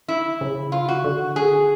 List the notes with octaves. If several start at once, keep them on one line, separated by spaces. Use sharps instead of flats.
E4
C#3
F4
F#4
D3
G#4